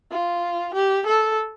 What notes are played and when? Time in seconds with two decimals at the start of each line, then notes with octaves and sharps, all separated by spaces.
0.12 F4
0.74 G4
1.06 A4